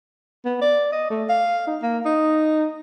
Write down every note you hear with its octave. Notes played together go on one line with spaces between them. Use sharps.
B3
D5
D#5
A3
F5
D#4
A#3
D#4